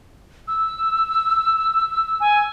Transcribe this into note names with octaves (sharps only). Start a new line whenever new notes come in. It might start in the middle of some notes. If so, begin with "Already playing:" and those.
E6
G#5